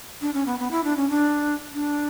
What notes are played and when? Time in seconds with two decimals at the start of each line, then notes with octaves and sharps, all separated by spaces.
0.21 D4
0.34 C#4
0.46 B3
0.59 B3
0.71 E4
0.84 D4
0.97 C#4
1.09 D4
1.74 D4